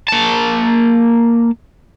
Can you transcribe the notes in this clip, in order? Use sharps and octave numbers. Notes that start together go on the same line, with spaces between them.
A#3 A5